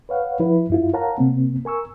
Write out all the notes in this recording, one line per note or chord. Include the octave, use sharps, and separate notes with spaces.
B4 C#5 F5 F#5
F3 E4 B4
F#2 E4 F4
A#4 C#5 F5 F#5 A5 A#5
C3 A#3 C4
A#4 G#5 C#6 E6